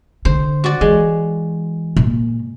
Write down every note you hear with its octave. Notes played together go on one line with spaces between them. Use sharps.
D3 C5
F#4 D5
E3 G#3
A#2